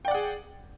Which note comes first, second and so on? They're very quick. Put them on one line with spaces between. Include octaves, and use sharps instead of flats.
G5 D5 F#5 G#4